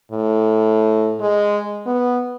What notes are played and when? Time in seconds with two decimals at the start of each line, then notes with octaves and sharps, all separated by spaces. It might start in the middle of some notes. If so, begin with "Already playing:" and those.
0.12 A2
1.20 G#3
1.87 B3